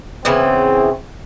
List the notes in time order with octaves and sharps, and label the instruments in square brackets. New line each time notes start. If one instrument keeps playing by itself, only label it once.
[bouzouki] C#3 E3 B3 [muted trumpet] C4